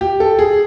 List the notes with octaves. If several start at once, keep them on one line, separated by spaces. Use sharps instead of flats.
G4
A4
G#4